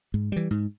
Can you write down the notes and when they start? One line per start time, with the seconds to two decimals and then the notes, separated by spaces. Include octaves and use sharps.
0.14 G#2
0.32 E3 G3
0.51 G#2